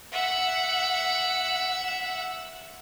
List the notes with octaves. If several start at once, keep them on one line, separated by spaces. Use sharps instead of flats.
E5 F#5